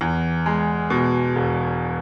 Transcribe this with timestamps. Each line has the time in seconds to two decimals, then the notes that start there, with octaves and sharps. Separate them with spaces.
0.01 E2
0.46 G#3
0.90 B2
1.36 E1